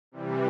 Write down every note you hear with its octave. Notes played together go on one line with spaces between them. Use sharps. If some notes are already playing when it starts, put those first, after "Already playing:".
C3 E3 G3